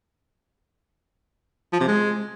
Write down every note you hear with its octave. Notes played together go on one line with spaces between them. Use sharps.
F3
C3
G#3